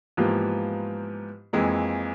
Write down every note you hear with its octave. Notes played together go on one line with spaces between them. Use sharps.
G#2 E3 F3 A#3 B3 G4
F2 E3 G#3 A#3